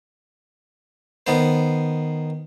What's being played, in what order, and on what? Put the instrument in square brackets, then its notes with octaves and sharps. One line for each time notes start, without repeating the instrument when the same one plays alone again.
[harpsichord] D#3 B3 C5